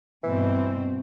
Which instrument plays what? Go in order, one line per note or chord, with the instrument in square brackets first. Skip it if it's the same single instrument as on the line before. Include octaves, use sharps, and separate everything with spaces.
[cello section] G2 B2 C4 [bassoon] E3